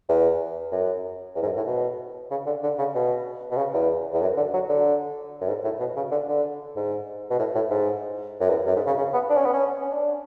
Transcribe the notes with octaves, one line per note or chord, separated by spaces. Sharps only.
E2
F#2
E2
G#2
F#2
A2
B2
C#3
D3
D3
C#3
B2
B2
C#3
E2
E2
F#2
D3
F#3
D3
F#2
G#2
A2
B2
C#3
D3
D3
G#2
B2
A2
A2
G#2
F#2
E2
F#2
G#2
C#3
C#3
B3
D4
C#4
B3
C#4
C#4
D4